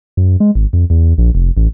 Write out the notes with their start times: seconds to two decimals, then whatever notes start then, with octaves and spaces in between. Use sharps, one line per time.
0.17 F#2
0.40 G#3
0.55 G#1
0.73 F2
0.90 E2
1.18 A#1
1.35 F1
1.57 A1